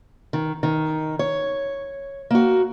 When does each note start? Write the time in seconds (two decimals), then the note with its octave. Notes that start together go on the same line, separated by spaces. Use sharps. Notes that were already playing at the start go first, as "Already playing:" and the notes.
0.33 D#3
0.63 D#3
1.19 C#5
2.30 A#3 F#4